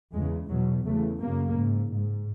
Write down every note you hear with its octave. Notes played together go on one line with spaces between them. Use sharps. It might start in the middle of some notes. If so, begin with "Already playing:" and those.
E2 C#3 G#3
E2 B2 F#3
E2 C#3 A3
F#2 C#3 A#3
G#2
G#2